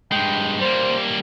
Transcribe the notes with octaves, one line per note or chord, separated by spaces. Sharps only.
G2 G#3 G5
G3 A#3 C5